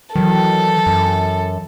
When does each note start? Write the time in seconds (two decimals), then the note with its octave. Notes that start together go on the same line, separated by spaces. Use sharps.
0.16 D#3 E3 F#3 A4
0.86 F#2